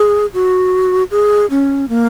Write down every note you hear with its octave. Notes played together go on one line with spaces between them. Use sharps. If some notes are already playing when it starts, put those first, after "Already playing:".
Already playing: G#4
F#4
G#4
C#4
A#3